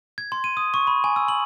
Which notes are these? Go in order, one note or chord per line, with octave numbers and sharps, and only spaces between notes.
G#6
C6
D#7
D#6
C#6
B5
G#5
E6
F#7